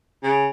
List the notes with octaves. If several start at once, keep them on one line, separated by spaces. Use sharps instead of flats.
C#3